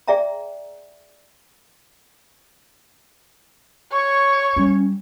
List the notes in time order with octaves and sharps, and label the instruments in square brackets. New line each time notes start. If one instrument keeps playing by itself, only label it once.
[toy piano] G#4 D5 E5 G5 A#5
[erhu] C#5 [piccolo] C#6
[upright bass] G3 [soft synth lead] C#4